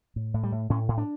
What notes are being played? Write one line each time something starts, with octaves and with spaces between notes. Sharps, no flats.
A2
A2
G3
A2
A2 C#4
A2
D4